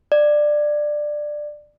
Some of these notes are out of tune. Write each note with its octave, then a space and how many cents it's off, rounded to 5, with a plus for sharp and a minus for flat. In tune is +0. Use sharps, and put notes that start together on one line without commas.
D5 +15